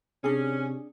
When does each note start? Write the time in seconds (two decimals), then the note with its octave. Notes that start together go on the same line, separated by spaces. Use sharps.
0.24 C3 C#4 D4 G#4